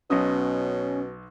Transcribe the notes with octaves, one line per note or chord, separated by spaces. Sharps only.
B1 B2 C#4 D#5 D#6